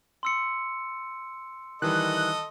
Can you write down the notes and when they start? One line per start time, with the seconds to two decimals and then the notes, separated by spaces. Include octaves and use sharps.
0.23 C6 E6 C#7
1.82 D#3 E3 G3 A4 D#5 F#6